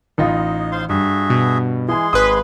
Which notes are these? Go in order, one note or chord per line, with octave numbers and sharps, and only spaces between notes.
A1 D#4 F4 D#5
C5 F5 C6
G2 F#4 G#4 E5
B2
E3 G#3 G#4 G#5 C6
G#1 B4 D#6